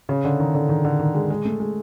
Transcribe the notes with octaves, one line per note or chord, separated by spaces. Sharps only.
C#3
D3
D#3
D3
D#3
D3
D#3
G#3
G#3
A3
G#3